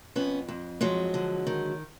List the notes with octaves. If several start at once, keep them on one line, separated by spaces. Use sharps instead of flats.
F2 B3 C#4
F2
F3 F#3 G#3
D3
D#3